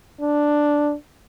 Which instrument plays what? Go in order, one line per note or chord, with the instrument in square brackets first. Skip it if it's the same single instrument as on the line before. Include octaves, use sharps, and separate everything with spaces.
[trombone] D4